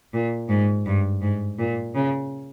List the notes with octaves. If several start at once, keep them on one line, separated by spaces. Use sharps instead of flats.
A#2
G#2
G2
G#2
A#2
C#3